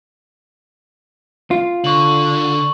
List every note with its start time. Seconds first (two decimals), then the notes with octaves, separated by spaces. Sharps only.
1.51 F4
1.84 D3 C#6 F#7